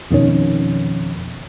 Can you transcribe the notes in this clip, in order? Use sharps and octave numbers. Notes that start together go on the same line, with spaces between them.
F2 B2 D#3 C#4